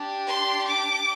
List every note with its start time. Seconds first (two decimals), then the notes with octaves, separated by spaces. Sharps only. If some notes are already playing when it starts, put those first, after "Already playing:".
Already playing: D4 G4
0.28 C6
0.68 D6